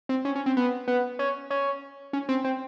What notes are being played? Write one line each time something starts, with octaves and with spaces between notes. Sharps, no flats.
C4
C#4
C#4
C4
B3
B3
C#4
C#4
C#4
C4
C4